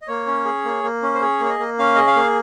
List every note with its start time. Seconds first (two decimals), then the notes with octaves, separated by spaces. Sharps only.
0.02 D#5
0.07 A#3 C#5
0.27 C#4
0.45 G#4
0.65 A#3
0.84 A#3
1.02 C#4
1.14 C5
1.21 G#4 C#5
1.40 A#3
1.45 C#5
1.50 D#5
1.59 A#3
1.79 C#4 F5
1.95 G#4 D#5
2.07 F5
2.16 A#3